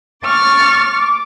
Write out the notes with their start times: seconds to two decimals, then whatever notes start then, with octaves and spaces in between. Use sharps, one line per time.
0.24 C#6 D6 F6 A6
0.93 D6